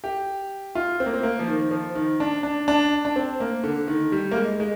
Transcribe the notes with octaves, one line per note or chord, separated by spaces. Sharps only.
G4
F4
C4
A#3
C4
A#3
F3
D#3
F3
D#3
D4
D4
D4
D4
C4
A#3
D3
D#3
G3
A#3
G#3
G#3